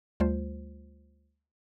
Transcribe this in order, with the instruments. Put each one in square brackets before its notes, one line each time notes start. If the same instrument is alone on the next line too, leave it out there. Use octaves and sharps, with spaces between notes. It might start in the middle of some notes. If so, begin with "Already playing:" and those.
[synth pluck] D2 G3 A3 F4 C5